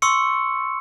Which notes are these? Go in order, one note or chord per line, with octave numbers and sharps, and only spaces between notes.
C6 C#6 E6 C#7